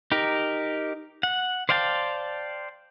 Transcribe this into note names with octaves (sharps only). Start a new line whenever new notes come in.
D#4 G4 A#4
F#5
C5 D5 F5 G5 A5